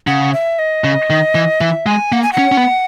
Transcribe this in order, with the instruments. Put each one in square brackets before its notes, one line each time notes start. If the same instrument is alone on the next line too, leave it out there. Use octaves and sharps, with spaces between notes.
[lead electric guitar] C#3 [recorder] F#5
[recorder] E5
D#5
[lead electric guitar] C#3
D#3
E3
[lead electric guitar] E3 [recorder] E5
[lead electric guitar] G#3 [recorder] G#5
[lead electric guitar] A#3 [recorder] F#5
[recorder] G#5
F#5
[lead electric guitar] C#4
C#4
B3